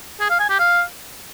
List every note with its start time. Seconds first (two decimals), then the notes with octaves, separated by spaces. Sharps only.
0.20 G#4
0.30 F5
0.40 G#5
0.49 G4
0.59 F5